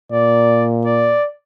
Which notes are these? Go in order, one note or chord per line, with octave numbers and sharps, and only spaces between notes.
A#2 D5
D5